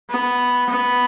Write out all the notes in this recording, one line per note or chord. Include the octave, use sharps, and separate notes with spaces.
B3
B3